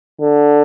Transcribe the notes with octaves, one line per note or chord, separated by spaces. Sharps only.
D3